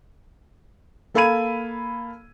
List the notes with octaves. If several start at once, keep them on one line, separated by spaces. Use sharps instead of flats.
A#3 A4 F5 B5 G#6 D#7